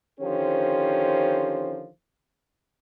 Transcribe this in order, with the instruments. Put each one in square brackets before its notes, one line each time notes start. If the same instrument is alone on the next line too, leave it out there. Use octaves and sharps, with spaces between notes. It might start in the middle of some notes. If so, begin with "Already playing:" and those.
[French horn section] D3 D#3 F3 C#4 G4 C5